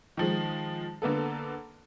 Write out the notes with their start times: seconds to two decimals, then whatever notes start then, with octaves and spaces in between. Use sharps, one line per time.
0.17 D#3 F3 G#3
1.02 D3 A#3 B3 A4